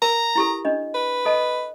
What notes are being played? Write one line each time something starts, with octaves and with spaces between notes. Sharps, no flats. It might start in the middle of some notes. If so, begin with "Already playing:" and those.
A#4 A#5
E4 G4 A4
D4 D#5
B4
A4 D#5 A5